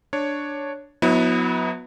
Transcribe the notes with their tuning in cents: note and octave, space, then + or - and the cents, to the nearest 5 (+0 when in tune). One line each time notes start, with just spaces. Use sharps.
D4 +0 C#5 +0
F#3 -35 B3 +0 E4 -40